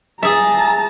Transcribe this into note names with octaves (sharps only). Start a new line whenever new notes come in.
G#4 E5 A5 A#5